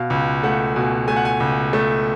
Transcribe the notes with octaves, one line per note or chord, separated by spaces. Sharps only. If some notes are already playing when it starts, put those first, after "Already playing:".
Already playing: B2 F5
C#2
A3 F#5
B2 G#5
A3 G#5
F#5
G#5
C#2
A3